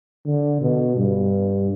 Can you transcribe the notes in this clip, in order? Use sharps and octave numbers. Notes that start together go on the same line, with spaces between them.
D3
B2
G2